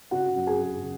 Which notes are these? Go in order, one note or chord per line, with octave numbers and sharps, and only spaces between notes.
C#3 F#4 F#5
F#2
G#4 G#5
F#2
C#3